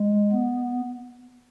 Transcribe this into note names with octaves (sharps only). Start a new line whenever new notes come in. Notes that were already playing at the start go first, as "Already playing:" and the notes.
Already playing: G#3
B3